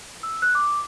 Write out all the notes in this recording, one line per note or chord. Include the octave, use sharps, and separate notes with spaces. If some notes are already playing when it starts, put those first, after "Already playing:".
E6
F#6
D6